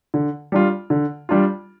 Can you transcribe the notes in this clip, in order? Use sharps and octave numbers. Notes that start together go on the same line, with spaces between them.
D3
G3 D4 F4
D3
G3 D4 F4